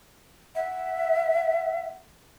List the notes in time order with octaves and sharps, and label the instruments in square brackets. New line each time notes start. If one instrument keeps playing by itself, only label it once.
[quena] E5 [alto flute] F#5